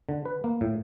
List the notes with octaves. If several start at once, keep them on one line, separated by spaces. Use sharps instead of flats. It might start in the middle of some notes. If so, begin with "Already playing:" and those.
D3
B4
A#3
A2